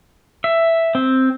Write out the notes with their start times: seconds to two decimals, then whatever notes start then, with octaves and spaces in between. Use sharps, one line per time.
0.44 E5
0.95 C4